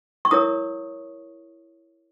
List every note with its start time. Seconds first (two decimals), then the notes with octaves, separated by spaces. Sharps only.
0.25 C#6
0.31 E4 A#4 C#5 D#6